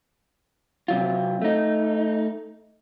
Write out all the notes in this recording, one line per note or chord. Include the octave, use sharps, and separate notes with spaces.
C3 F#3 F4
A3 D#4